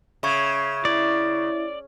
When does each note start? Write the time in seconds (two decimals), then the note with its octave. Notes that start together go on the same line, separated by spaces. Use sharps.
0.23 C#3 E5 C#6 G#6
0.85 E4 D5